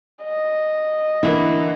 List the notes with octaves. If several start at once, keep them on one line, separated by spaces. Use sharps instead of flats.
D#5
D3 E3 A#3 E4